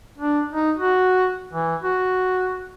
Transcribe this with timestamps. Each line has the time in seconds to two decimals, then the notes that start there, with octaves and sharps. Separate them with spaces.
0.18 D4
0.53 D#4
0.78 F#4
1.54 E3
1.83 F#4